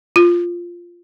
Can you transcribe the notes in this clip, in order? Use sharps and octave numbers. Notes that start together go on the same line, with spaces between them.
F4